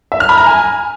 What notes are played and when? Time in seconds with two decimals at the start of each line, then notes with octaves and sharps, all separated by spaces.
0.12 E5
0.20 F6
0.29 B5
0.38 A#5
0.46 G#5